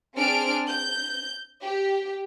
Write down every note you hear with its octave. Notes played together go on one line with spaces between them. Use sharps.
C4 D4 G#4 F6 D7
G6
G4